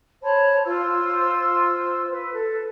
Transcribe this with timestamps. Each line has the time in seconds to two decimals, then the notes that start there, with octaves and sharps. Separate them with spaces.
0.22 C5 C#5 A5 B5
0.64 F4 C5 C6 E6
2.12 B4
2.33 A4